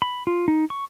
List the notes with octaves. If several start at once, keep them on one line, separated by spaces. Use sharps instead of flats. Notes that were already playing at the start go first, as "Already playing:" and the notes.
B5
F4
D#4
C#6